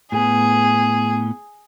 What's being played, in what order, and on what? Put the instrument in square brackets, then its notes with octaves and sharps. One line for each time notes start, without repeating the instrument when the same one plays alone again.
[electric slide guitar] A2 B3 [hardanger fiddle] G#4